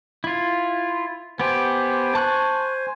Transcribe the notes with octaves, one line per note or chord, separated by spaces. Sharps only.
E4 F4
B3 G4 C5 G#5
A5 C#6 F#6